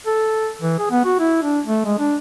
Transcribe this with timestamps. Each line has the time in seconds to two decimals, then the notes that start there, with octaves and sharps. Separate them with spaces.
0.07 A4
0.62 E3
0.79 G#4
0.91 B3
1.05 F#4
1.20 E4
1.42 D4
1.65 A3
1.85 G#3
1.99 D4